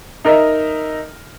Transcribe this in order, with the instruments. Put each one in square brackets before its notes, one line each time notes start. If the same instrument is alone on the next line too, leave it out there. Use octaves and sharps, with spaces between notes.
[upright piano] D#4 A#4 D#5 E5